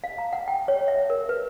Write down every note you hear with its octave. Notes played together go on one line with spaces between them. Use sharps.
F5
A#5
F#5
G5
C#5
E5
A#4
B4